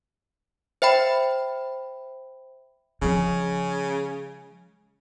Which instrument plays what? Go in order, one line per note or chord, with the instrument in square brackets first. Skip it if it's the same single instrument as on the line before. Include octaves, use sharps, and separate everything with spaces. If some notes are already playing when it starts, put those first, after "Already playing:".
[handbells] C5 E5 G5 B5
[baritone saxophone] C#3 [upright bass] F3 G#3